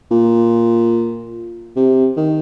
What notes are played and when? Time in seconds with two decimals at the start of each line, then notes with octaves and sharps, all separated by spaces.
0.11 A#2
1.76 C3
2.16 D#3